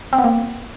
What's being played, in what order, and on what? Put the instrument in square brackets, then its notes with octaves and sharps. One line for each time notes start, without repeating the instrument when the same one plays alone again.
[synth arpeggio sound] C4
B3
A#3